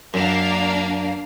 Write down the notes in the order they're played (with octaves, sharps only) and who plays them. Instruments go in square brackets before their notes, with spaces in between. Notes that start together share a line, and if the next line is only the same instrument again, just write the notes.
[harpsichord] F#2 [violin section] A#3 D4 F5